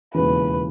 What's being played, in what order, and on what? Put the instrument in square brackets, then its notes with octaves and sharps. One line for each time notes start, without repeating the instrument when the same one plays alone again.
[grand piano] E1 D#2 C#3 E3 [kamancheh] B4